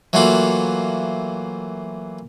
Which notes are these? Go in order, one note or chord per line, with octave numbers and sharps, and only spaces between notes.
E3 F#3 A3 A#3 F4 F#4